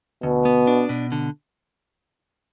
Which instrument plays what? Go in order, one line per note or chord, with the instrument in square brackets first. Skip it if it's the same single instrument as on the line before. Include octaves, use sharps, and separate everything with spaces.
[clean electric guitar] D2 [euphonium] B2
[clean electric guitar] B3
D4
B2
D3